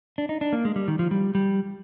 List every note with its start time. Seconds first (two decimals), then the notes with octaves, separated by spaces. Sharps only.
0.18 D4
0.29 D#4
0.41 D4
0.53 A#3
0.65 G#3
0.76 G3
0.88 D#3
0.99 F3
1.11 G3
1.35 G3